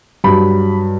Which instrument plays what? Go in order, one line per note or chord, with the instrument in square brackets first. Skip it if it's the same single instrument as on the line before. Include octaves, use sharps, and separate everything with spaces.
[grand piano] G2 F#3 B5